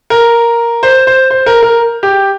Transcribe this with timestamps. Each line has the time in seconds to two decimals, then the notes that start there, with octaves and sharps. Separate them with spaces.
0.10 A#4
0.83 C5
1.07 C5
1.30 C5
1.46 A#4
1.63 A#4
2.03 G4